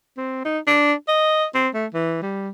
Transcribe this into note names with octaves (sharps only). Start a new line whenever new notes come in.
C4
D#4
D4
D#5
C4
A3
E3
G3